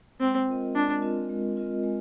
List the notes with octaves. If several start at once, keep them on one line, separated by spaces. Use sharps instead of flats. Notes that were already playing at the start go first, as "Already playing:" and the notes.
G#3 C4
C4 F4 A#4 D#5
G#3 D4
C4 F4 A#4 D#5
G#3
C4 F4 A#4 D#5
G#3